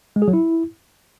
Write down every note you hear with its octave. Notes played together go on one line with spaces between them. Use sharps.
G#3
G#4
F#3
E4